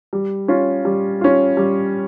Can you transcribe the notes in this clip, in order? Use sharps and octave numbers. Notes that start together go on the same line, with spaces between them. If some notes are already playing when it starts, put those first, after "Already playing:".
G3
C#4 F4
G3
C#4 F4
G3